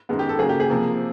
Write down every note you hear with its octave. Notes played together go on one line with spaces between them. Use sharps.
F#2 D#3 G#3 B3
G4
A4
C#3 F#3 A#3 G#4
G4
G#4
C3 F3 A#3